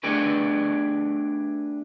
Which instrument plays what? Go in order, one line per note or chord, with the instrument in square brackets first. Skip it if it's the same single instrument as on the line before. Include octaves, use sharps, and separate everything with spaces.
[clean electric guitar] A3 B3 D4 G4 G#4 B4